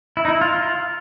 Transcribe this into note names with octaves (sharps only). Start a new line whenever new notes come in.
E4
D#4
E4
F4
F4